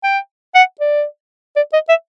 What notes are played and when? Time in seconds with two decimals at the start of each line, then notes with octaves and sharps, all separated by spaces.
0.03 G5
0.55 F#5
0.80 D5
1.56 D5
1.73 D#5
1.89 E5